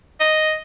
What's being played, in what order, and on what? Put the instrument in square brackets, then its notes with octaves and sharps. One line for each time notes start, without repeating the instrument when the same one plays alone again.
[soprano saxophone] D#5